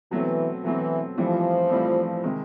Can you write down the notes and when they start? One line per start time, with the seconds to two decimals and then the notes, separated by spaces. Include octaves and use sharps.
0.11 B2 E3 F#3 A3 C4
0.64 B2 E3 F#3 A3 C4
1.17 A2 E3 F3 G3 C4
1.70 A2 E3 G3 C4
2.24 C3 D#3 G#3